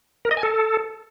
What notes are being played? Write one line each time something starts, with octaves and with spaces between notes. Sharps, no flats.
A#4
D#5
G#5
A4